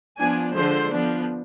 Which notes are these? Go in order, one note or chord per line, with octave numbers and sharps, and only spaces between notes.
F3 B3 D4 G#5
D3 F3 G#3 C5
F3 B3 D4